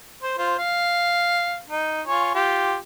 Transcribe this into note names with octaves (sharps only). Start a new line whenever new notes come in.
C5
F4 C5
F5
D#4
F4 C#5 G#5
F4 G4